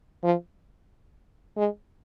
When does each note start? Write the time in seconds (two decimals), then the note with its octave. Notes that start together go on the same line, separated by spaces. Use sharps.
0.24 F3
1.57 G#3